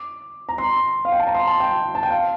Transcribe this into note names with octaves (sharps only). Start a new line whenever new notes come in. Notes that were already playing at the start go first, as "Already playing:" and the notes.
Already playing: D6
A#5
C6
F5
G5
A5
A#5
C6
A5
G5
A5
G5
F5